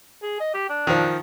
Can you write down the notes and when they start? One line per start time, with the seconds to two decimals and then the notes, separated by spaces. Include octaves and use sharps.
0.23 G#4
0.40 D#5
0.54 G4
0.69 D4
0.87 D#3 F3